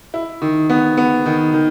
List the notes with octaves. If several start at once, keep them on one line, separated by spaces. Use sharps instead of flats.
E4
D#3
B3
B3
D#3
D#3